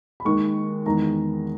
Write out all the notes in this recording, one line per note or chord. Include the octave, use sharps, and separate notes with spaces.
B5
D#2 D#3 G#3 C#6
E2 D#3 G#3 A#5